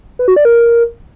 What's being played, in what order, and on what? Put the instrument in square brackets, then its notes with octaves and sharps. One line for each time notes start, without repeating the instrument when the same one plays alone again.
[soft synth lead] B4
F#4
D5
A#4